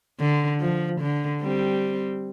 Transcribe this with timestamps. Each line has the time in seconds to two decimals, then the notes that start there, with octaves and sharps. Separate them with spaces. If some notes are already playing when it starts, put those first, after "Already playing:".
0.20 D3
0.61 F3
1.01 D3
1.42 G3 C4